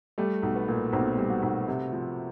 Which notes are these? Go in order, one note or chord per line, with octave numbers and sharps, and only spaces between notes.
G3 A3
B1
B3
A#2
B1 C4
G3
F#4
B1
C3
F3